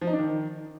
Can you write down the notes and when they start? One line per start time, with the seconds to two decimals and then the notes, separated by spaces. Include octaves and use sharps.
0.02 F3
0.07 D#4
0.13 D4
0.19 D#3